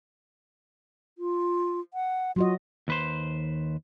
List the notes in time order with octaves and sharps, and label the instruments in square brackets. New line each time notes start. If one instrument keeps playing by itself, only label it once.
[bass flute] F4
F#5
[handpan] F#3 F#4 D#5 [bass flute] F4
[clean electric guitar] D#2 B4 C5